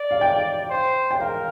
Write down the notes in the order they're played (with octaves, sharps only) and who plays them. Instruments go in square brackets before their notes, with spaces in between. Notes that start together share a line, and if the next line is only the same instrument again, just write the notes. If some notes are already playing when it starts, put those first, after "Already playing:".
Already playing: [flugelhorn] D5
[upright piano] F5
G5
[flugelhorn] C5
[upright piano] G5
[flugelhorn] A#4 [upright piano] F5